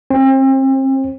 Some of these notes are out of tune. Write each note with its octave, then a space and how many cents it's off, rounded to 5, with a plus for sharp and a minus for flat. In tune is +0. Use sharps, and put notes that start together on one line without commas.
C4 +35